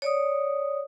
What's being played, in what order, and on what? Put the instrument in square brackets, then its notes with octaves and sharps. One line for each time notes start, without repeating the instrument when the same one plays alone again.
[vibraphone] C#5 D5 D#6